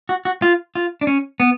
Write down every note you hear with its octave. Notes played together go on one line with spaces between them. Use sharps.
F#4
F#4
F4
F4
D4
C#4
B3